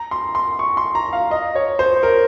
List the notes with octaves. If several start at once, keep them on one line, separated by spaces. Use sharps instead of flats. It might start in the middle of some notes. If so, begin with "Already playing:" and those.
Already playing: A#5
C6
C6
C#6
C6
A#5
F5
D#5
C#5
C5
A#4